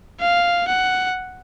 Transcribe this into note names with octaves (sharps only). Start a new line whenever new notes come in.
F5
F#5